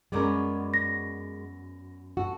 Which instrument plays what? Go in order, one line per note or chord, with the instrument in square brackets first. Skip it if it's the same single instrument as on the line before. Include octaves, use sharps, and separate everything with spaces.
[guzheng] F#2 B3 D5 [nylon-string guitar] G#3 A#4
[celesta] A#6
[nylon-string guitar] F#4 [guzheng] A4